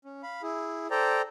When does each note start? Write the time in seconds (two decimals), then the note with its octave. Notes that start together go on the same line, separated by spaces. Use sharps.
0.05 C#4
0.23 F5 B5
0.43 E4 G#4
0.91 A4 C5 D5 G5 A#5